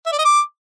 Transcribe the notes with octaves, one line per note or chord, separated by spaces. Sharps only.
E5
D5
D#5
D6